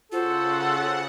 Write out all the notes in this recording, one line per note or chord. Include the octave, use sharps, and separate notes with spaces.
C#3 F4 F#4 A4 C5 F#5